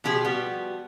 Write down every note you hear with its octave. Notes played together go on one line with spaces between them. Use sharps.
B2 F3 G4 G#4
F3 G3 B3 F#4 G4